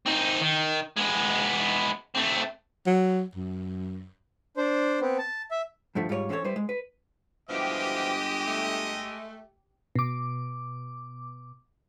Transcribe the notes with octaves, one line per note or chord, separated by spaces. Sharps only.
C4 D#4
D#3
G#3 B3
A3 C4
F#3
F#2
D4 C5
B3 C4
A5
E5
G2 D3 F3 A3
G#2 G3 F4 G4 C#5
E3 C4 C#4 F#4 A4 C#5
G3 E4 B4 C5
G#3
B4
G1 B2 E3 F3 G#3 G4 D#5
A3
B2 D6